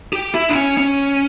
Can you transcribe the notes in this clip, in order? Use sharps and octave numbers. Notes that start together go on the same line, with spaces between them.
G4
E4
D4
C#4
C#4